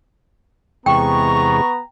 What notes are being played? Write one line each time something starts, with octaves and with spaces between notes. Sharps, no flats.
E2 C3 G#3 B3 G5 A#5 C#6